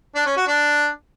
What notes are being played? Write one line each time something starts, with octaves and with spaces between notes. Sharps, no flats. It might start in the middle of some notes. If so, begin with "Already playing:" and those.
D4
C#4
F#4
D4